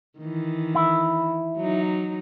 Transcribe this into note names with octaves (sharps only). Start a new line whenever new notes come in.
D#3 E3
E4
F#3 D#4